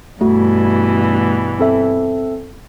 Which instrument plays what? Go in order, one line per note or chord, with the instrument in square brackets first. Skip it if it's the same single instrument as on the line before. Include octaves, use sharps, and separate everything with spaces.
[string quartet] G2 B2 E3 [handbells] A3 F#4
[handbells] C4 A4 E5